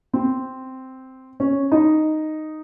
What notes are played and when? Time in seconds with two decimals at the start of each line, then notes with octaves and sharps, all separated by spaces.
0.14 C4
1.40 C#4
1.72 D#4